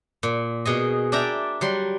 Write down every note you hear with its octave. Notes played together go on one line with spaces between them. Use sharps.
A#2
B2 G#4 D#5
D4 D5 E5 G5 A#5
F#3 G3 C6